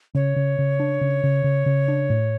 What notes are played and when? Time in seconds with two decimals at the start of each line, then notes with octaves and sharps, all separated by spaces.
0.15 C#3 C#5
0.36 C#3
0.59 C#3
0.80 D4
1.01 C#3
1.24 C#3
1.44 C#3
1.66 C#3
1.88 D4
2.10 A2